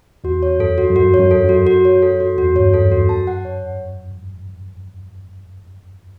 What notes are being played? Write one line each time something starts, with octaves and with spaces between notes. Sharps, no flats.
E2 F#4
C#5
F#2 A4
F#4
F#2
G2 F#4
C#5
F#2
A4
F#2
F#4
F#4
C#5
A4
F#4
E2 F#4
G2 C#5
F#2
A4
F#2
E2
F#4
F#2 A5
F#5
C#5